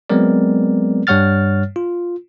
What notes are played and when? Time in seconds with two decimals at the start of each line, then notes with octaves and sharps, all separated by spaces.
0.10 F#3 G#3 B3 C4 A#4 D5
1.07 G2 G3 C#5 F#5 F6 A6
1.76 F4